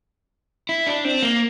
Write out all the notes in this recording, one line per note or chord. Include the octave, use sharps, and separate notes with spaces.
E4
D4
C4
A#3